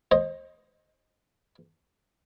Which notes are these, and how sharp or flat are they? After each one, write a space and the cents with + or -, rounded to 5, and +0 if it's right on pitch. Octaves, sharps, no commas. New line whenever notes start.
C5 +30 D#5 +0